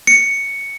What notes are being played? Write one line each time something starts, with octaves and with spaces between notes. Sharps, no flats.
C#7